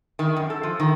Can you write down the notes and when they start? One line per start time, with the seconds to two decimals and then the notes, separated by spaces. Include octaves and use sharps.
0.19 D#3
0.37 F#2
0.50 A4
0.63 F3
0.80 D#3